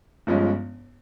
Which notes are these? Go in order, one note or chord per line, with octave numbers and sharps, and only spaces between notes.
G1 G2 F3 G#3 C#4